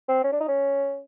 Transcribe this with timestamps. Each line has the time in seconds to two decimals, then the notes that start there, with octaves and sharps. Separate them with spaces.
0.09 C4
0.24 C#4
0.32 D4
0.41 D#4
0.48 C#4